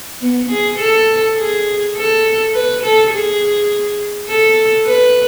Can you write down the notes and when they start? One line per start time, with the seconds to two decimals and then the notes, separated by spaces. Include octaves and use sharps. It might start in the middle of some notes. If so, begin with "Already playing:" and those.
0.21 B3
0.50 G#4
0.79 A4
1.37 G#4
1.96 A4
2.54 B4
2.83 A4
3.12 G#4
4.28 A4
4.87 B4